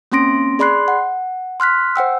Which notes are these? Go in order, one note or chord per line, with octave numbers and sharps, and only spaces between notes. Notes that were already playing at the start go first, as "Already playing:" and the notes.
A#3 C4 C#4 C6 A#6 D7
G#4 D5 B5 C6 F#6 C7
F#5
C6 F6 F#6 B6
C5 F#5 G5 E6